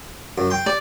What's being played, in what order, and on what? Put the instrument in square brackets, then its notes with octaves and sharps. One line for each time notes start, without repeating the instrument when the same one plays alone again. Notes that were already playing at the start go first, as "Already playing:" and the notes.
[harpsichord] F#2
G5 C6
[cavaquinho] D5